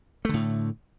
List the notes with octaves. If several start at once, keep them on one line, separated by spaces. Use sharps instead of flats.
A2 D3 A3